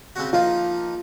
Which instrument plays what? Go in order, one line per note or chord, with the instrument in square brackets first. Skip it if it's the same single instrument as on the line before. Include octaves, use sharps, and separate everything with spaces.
[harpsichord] C#3 C4 F#4
[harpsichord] F3 A#3 D#4 [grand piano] F4